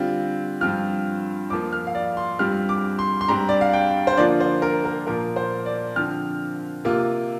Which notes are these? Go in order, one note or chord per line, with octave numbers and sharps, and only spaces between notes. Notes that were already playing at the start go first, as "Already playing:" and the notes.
Already playing: D3 G3 C4 F4
G2 F3 C4 F4 F6
F2 F3 A#3 D6
F6
F5
D5
C6
G2 G3 C4 F4 F6
D6
C6
C6
G2 G3 C4 A#5
D5
F5
G5
C5
D3 F3 A#3 F4 D5
C5
A#4
A#4
A#2 F3 A#3 A#4
C5
D5
D3 F3 C4 F6
C3 A#3 F4